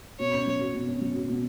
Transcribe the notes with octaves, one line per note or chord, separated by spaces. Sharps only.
B2 C#5
C#4
F#3
F#4
B2
C#4
F#3
F#4
B2